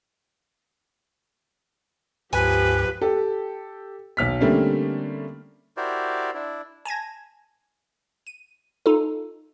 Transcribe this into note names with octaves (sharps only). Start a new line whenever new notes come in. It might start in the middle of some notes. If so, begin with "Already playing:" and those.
C#2 G2 F3 G4 B4 G#5
G4 A4
B1 F6 B6
D3 G3 A3 A#3 C4 C#4
E4 F#4 G4 A#4 C5 D5
D4 E4
G#5 A5 G#6 A#6
D#7
D#4 F4 A4